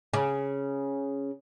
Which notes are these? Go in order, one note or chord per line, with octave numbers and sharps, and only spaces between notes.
C#3